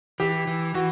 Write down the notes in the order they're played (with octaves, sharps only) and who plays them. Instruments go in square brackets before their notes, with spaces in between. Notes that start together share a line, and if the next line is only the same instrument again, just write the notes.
[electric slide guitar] E3 [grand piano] G4
[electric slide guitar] E3
[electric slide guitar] E3 [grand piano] F#4